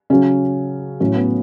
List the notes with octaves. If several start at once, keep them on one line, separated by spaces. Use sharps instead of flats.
C#3 F#3 C#4
A2 F#3 C#4
B3